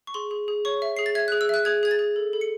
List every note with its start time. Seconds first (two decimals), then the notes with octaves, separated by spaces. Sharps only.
0.07 C#6
0.14 G#4 C6
0.31 G#4
0.48 G#4
0.65 C#5 C#6
0.82 E5
0.97 G#4 C7
1.06 A6
1.15 E5 G#6
1.28 G#4 F#6
1.41 E6
1.49 E5 F#6
1.65 G#4 G#6
1.83 G#4 G#6
1.91 A6
1.99 G#4
2.16 A4
2.33 A4
2.41 C#7